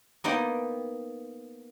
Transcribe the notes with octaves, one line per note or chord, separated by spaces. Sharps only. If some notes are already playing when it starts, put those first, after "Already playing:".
A#3 B3 D#4 C5 D#5 G5